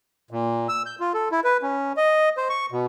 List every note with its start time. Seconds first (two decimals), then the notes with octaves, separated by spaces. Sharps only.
0.31 A#2
0.69 E6
0.86 G6
1.00 F4
1.14 A4
1.32 E4
1.44 B4
1.63 C#4
1.97 D#5
2.37 C5
2.49 C#6
2.72 B2